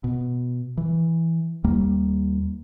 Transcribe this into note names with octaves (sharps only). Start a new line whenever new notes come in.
B2
E3
D#2 G3 A#3